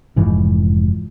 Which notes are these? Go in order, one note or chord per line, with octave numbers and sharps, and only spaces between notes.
F1 G#2 E3 F3